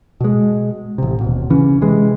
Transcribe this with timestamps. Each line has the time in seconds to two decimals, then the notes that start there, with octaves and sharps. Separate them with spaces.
0.21 B2 G#3
0.98 A1 C3
1.21 D#1 B2
1.50 C#3 E3 C#4
1.81 C3 E3 G#3